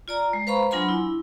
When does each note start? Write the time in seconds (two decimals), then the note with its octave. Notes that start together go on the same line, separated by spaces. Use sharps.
0.08 F4 D5 A#5
0.33 G#3
0.47 B4 C5 F5 A#5 B5 C#6
0.71 F#3 D4 F4 G#5 B5 C6
0.88 E4